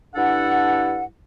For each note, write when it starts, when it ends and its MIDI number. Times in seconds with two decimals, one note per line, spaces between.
0.15 1.05 43
0.15 1.05 62
0.15 1.05 64
0.15 1.05 69
0.15 1.05 78